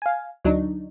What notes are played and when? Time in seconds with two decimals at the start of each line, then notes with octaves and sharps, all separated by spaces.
0.02 F5 G#5
0.44 D2 F#3 D4 D#4